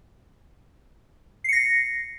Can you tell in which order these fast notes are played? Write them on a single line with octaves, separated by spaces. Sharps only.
C7 C#7 A#6